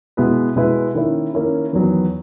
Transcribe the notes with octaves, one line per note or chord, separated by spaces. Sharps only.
B2 G#3 B3 E4 B4
B2 G#3 B3 E4 B4
D#3 A#3 C#4 E4
D#3 A#3 C#4 E4
E2 D#3 F#3 B3